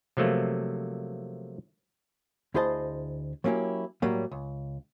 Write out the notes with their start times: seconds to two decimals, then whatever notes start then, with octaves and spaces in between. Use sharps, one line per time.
0.17 C3 F3 F#3 A3 A#3
2.54 D2 E4 G#4 C5 D#5 A5
3.44 F#3 A#3 C#4 E4 G4
4.02 A2 F#3 G3 A#3
4.31 C#2